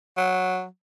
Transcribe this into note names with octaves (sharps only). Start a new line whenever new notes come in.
F#3